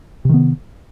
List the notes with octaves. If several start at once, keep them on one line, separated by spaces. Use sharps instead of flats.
C3 D#3 B3